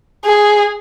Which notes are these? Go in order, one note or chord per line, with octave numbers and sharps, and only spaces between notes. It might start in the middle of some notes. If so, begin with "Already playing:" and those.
G#4